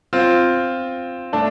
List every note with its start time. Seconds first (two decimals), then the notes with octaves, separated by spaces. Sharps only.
0.13 C4 F4
1.33 A3 D4